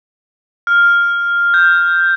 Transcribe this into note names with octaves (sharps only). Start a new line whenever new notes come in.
F6
G6